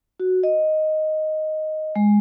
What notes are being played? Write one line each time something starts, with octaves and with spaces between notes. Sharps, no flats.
F#4
D#5
G#3